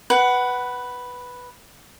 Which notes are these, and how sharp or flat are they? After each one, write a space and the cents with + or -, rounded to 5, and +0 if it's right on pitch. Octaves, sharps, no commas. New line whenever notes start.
B4 +0 F#5 +20